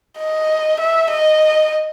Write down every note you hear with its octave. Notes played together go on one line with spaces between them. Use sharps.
D#5
E5
D#5